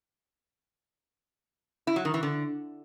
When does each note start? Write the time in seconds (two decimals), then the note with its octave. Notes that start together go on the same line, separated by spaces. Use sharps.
1.87 E4
1.96 F#3
2.05 D#3
2.14 E3
2.23 D3